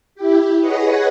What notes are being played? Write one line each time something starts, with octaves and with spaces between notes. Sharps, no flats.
E4 G4
G#4 B4 C#5 D#5 F#5